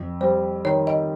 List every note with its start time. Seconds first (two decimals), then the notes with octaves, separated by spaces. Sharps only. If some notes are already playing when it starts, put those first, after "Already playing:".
Already playing: F2
0.21 G3 C5
0.65 D#3 C#5
0.87 D#5